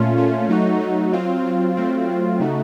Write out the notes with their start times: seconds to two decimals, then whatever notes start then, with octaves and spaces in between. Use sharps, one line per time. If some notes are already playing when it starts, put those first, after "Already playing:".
Already playing: A#2 A3 C#4 F4
0.17 A#2 A3 C#4 F4
0.49 F#3 A3 D#4 F#4
0.80 F#3 A3 D#4 F#4
1.13 F#3 C4 F4
1.44 F#3 C4 F4
1.76 F#3 A3 C4 F4
2.08 F#3 A3 C4 F4
2.40 C#3 A3 D#4 F#4